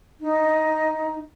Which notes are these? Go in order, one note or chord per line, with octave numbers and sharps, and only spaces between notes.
D#4